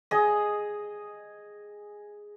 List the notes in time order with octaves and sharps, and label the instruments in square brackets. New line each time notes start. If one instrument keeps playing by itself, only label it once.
[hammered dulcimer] G#4 D#5